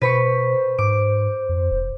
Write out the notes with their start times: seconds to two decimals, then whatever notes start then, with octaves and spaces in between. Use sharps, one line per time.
0.01 B2 B4 C5 B5 C#6
0.78 G#2 D6
1.49 F2
1.71 E1